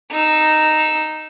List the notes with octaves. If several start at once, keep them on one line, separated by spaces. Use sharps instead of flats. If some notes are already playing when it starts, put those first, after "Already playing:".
D#4 E6